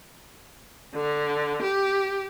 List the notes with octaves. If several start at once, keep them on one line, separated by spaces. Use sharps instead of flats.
D3
G4